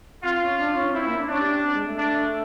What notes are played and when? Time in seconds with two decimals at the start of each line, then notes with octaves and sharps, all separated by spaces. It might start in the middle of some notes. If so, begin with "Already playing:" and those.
0.23 C4 F4
0.41 C#4
0.58 D4
0.75 C#4
0.94 C4 E4
1.06 A#3
1.16 D4
1.28 C#4 D4
1.40 G4
1.62 C4
1.74 G#3
1.86 A3
1.98 D4